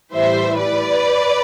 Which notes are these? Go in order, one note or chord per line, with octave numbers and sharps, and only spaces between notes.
A2 E3 G3 C5 E5
B4 D5